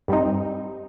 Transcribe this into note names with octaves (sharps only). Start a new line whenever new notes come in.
G2 G3 C4 D#4